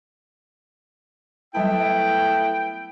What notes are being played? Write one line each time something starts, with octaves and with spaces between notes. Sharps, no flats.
F#3 G3 A3 B3 E4 G5 A5